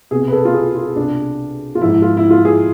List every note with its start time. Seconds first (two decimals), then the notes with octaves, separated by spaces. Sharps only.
0.11 C2 B2 G#4
0.28 B4
0.32 A4
0.45 F4
0.54 G#4
0.75 F4
0.96 C2 B2 D4
1.75 F4
1.81 G#2 F3 E4
2.02 F4
2.17 E4
2.30 F4
2.45 G#4